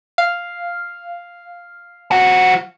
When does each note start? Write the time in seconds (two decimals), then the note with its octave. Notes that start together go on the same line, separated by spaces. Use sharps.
0.18 F5
2.11 F3 F#4